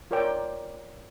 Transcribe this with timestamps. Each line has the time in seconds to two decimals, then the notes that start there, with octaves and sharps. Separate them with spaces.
0.11 F4 A#4 C#5 D5 G5